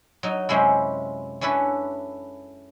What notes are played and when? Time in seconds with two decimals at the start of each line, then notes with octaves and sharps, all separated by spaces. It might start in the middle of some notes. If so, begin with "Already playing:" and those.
0.23 F#3 D#4
0.49 F#2 C3 G#3 C#4 E4
1.41 C#4 D4 E4 A4 B4